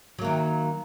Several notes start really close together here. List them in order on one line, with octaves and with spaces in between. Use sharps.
F#3 A#3 D#3